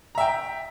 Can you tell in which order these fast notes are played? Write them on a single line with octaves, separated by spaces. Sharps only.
A#5 E5 G5